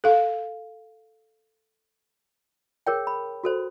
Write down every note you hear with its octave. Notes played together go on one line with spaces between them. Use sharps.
A4 F5
G#4 A#4 C#5 G5
B5
F#4 A4 C5